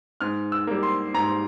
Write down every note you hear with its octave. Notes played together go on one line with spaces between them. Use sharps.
G#2 F6
E6
G3 A#3
C6
G#2 A#5